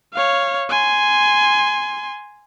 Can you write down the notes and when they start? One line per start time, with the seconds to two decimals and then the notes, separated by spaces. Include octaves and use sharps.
0.14 C#5 F5
0.70 G#5 C6